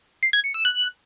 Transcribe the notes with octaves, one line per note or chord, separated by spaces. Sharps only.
C7
G#6
C#7
E6
F#6